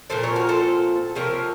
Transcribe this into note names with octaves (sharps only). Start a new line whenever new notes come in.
A#2 F3 C4 A4 C5
A#4 C#5
F#4 A#4
A4 C5
C3 F3 A#3 A#4 C#5